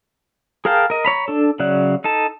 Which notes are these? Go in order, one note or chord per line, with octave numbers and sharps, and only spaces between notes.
G#4 A#4 F5 G5 A5
A#4 D#5
C#5 A#5 B5
D4 A4
C#3 F#3 D5 E5 F#6
D#4 A4 A5